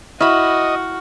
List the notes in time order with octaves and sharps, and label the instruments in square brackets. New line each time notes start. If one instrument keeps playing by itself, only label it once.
[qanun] E4 B5 [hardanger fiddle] F#4 [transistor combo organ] D#5 [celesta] C#6 F6